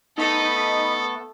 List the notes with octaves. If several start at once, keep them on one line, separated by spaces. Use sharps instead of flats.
A3 B3 D#4 A4 B5 D#6